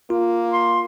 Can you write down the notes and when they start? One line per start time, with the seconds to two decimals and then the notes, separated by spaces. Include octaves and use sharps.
0.10 A#3 F4
0.53 C6